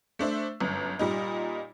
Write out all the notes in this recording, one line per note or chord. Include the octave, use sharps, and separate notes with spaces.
A3 D4 C5 E5
G1 F#2
A#2 G3 D#4